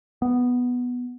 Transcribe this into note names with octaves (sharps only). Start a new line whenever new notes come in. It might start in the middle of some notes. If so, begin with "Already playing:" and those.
B3